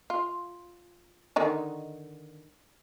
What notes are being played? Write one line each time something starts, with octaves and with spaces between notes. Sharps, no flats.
F4
D3 D#3 D#4